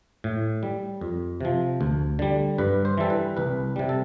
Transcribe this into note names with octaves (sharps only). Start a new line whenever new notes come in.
A2
G3
F2
C3 F3
D2
D3 G3
G2 B4
C5
E3 G3 A4
B4
C2 B4
C3 G3
A4